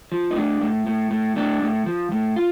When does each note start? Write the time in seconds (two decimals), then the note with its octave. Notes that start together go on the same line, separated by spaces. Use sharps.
0.12 F3
0.31 D#4
0.36 A2 D4
0.61 A2
0.86 A2
1.11 A2
1.36 A2 D4
1.62 A2
1.86 F3
2.12 A2
2.36 F4